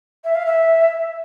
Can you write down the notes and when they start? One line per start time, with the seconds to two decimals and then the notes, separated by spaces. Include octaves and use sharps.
0.24 E5
0.35 F5
0.46 E5